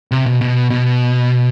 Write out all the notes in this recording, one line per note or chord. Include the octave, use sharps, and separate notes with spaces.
C3
B2
B2
B2